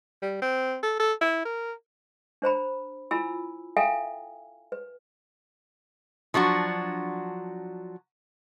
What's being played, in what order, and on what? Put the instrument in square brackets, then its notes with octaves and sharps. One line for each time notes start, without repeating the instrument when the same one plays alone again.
[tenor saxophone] G3
C4
A4
A4
E4
A#4
[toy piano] D4 C5 A#5 B5
E4 F4 G#5 A#5 B5 E6
A4 E5 F5 G5 G#5 A#5
B4
[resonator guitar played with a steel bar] F3 F#3 D4 F#4